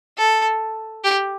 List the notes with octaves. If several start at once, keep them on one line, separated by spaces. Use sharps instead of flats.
A4
G4